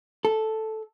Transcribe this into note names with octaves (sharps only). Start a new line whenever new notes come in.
A4